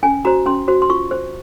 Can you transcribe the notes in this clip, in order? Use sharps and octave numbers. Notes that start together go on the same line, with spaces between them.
C#4 G#5
F#4 C5 A#5
C#4 C6
F#4 C5
C6
F4 C#6
C5